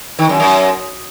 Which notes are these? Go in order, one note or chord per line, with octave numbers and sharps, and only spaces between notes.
D#3
F#2
F#2